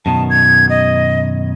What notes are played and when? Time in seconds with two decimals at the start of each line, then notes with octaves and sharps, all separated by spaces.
0.06 F#2 B2 D#3 A5
0.30 G#6
0.69 D#5